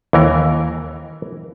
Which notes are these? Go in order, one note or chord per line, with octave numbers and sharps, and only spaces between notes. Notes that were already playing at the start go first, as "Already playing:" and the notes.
D#2 E3 A#4